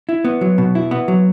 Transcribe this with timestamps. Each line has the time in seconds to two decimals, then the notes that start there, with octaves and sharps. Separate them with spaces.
0.09 E4
0.25 B3
0.41 F#3
0.58 B2
0.75 E4
0.91 B3
1.08 F#3